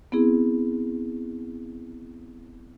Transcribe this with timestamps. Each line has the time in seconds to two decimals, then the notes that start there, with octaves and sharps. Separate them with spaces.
0.12 B3 C4 E4 G#4